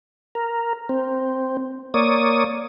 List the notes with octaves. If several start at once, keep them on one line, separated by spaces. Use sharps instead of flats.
A#4
C4
A#3 C#5 D5 D#6